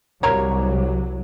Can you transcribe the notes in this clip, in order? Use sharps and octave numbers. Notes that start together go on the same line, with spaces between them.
C2 F#3 A#3 A#4 C#5